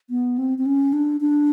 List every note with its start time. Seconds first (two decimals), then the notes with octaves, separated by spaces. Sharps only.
0.10 B3
0.38 C4
0.58 C4
0.66 C#4
0.93 D4
1.21 D4